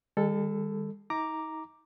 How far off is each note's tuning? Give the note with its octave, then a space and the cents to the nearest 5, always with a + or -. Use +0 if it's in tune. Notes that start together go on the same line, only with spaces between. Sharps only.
D#3 +0 G#3 -45 A4 +0
D#4 +40 A#5 +0 D6 +0